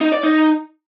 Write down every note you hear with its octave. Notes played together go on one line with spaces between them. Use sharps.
D#4
D5
D#4